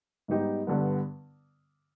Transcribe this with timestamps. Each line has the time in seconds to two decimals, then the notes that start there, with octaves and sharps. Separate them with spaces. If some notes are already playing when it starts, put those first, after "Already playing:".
0.28 G#2 G3 B3 D#4 G4
0.67 G2 D3 G3 B3